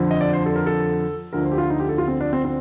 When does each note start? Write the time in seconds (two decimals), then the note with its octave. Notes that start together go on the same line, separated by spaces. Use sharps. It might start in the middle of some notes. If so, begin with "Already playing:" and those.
Already playing: F2 D3 F3
0.11 D#5
0.21 D5
0.33 C5
0.46 A4
0.56 A#4
0.66 A4
1.33 D2 D3 F3 A#4
1.45 C5
1.52 G4
1.58 F4
1.70 D#4
1.80 G4
1.89 A4
1.98 F4
2.08 C4
2.21 D4
2.33 C4
2.45 C4